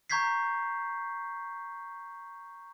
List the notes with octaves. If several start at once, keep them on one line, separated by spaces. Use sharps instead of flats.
A#5 C#6 G6 G#6 B6 C7